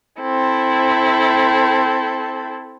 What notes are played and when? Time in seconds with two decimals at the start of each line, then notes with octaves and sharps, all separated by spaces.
0.21 C4 E4 A4